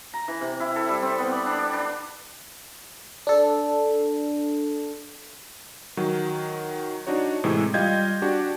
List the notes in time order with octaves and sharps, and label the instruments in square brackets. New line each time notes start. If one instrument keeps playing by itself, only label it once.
[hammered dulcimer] A#5
E3
C3
E4
A4
G3
C4
B3
D5
D4
D5
D4
[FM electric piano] D4 A4
[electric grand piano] D#3 F#3
D4 D#4 F#4 C#5
A2 C3 E3 G#3
G3 F4 D#5 G5 G6 G#6
D4 F#4 G4